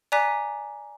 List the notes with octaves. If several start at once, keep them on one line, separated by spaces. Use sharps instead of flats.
D5 G#5 A#5 D6 F#6 B6